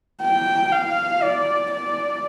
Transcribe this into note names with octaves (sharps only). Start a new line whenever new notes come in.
G5
F5
D5
D5